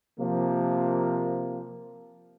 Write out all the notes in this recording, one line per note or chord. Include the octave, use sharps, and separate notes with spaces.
C3 F3 A#3